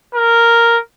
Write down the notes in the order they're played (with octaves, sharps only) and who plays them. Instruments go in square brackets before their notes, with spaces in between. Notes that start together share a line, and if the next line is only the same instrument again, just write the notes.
[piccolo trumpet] A#4